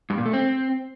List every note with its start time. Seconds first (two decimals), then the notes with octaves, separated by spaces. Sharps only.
0.10 G2
0.18 A#2
0.26 A3
0.33 C4